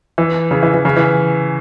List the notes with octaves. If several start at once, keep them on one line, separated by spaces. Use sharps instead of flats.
E3
C#3
E3
E3
C#3
E3